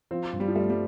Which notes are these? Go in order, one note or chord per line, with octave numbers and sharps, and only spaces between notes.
F3 C4
G2
G3
F3
G3 A3
G3